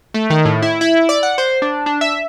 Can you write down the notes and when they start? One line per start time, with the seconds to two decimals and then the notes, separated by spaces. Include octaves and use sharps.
0.14 A3
0.30 D#3
0.45 A2
0.62 E4
0.81 E4
1.09 D5
1.23 F#5
1.38 C5
1.62 D4
1.86 D4
2.01 E5